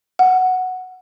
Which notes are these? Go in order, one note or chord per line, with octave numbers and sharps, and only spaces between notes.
F#5